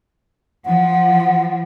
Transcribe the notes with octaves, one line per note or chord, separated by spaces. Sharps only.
F3 F#5